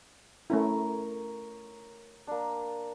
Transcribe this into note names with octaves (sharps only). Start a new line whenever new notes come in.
A3 C#4 E4 A#4 C#5
A#3 D4